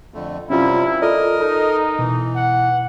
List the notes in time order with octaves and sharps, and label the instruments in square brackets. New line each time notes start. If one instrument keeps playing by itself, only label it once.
[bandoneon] F2 D3 A3
[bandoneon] F#2 C3 G3 [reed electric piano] C#4 F4 [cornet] E4
[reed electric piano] F4 A4 D5 [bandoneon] A#4 D#5
[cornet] D#4 [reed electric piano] A4
[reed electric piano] B2 [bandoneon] E3
[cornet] F#5